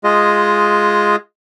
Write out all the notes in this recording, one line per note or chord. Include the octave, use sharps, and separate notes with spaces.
G#3 F4 G#4 D#5